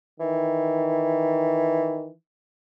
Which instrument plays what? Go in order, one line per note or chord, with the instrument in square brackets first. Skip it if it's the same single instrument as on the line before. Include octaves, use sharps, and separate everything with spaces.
[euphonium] D#3 [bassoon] E3